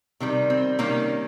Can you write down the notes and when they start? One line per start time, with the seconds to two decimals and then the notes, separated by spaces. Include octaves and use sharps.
0.20 C3 D#3 G3
0.50 C4
0.79 C3 D#3 G3 A#3 C#4